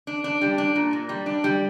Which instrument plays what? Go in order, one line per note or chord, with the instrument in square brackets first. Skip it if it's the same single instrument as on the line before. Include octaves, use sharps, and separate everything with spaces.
[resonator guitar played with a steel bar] D4
D4
G3
D4
A#2
A#2
G3
D4
G3